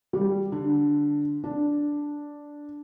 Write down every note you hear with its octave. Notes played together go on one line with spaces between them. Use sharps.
G3
D3
D4